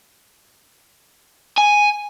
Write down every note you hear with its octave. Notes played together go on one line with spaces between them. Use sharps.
G#5